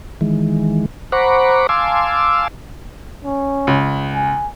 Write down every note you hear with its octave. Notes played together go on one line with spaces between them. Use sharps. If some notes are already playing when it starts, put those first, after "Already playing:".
D#3 E3 G#3
C5 F#5 A#5 B5 C#6 D6
F5 G#5 A5 C6 D6 E6
C#4
C#2
G#5